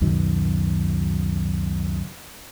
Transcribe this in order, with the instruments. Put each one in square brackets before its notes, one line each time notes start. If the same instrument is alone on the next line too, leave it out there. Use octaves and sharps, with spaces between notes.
[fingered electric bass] C#2 F#2 B2 D#3